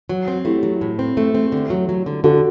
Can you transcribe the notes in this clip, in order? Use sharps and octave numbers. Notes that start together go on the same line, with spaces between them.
F#3
C4
A3 E4 G4
F#3
A2
C4
A3
C4
D3
F#3
F#3
D3
D3 F#4 A4